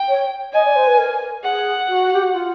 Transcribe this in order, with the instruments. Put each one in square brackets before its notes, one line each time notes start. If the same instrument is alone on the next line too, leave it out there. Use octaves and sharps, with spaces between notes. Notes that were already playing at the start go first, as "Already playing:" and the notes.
Already playing: [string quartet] G5
[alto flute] C#5
[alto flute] D#5 [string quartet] G#5
[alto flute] D5
C5
B4
A#4
[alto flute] G#4 [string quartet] F#5
[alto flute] F#4
G4
F#4
F4